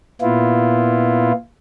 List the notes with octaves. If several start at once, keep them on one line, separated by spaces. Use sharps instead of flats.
A#2 B3 E4 F4